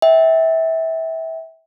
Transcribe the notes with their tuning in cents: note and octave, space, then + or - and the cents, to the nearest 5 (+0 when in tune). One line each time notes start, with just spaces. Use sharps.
E5 -25 G5 +0